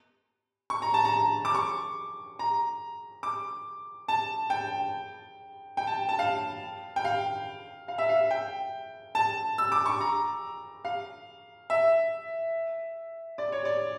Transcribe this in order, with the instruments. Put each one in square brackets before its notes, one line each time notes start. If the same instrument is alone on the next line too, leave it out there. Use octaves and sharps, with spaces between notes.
[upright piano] C#6
A#5
A5
A#5
D6
C#6
A#5
D6
A5
G5
G5
A5
A5
F5
G5
F5
F5
E5
F5
G5
A5
E6
D6
C#6
A#5
F5
E5
D5
C#5
D5